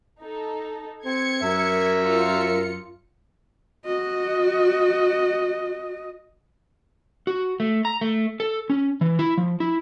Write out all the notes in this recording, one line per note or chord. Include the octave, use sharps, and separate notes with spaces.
D#4 A4
C4 G#6 C#7
F#2 A#4 E5
F4 C#7
F#4 D#5
F#4
A3
A#5
A3
A4
C#4
E3
E4
F3
E4